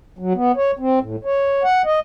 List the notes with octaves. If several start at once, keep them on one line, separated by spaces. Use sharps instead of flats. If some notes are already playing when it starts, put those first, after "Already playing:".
F#3
B3
C#5
C4
A2
C#5
F#5
D#5